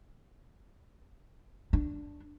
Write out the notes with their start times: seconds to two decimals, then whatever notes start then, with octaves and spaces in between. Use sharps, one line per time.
1.73 D4